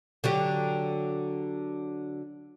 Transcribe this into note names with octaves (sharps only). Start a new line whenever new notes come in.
D3 F#3 G4